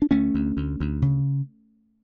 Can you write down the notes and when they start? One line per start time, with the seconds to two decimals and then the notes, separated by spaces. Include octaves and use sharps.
0.02 D4
0.11 D2 A3 C#4
0.34 D2
0.57 D2
0.80 D2
1.02 C#3